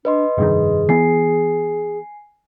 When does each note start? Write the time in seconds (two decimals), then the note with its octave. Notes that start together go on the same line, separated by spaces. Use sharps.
0.05 D4 B4 D#5 C6
0.38 F1 G2 D#3 G#4
0.89 E3 B3 G#5 C7